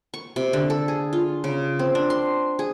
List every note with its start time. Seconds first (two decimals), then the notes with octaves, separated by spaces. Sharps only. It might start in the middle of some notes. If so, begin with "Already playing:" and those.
0.14 C#6
0.36 C3
0.53 D3
0.70 A4
0.88 G#4
1.13 F4
1.44 C#3
1.79 C4
1.95 D4
2.10 C6
2.59 G#4